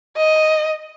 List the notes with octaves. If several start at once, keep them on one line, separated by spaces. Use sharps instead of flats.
D#5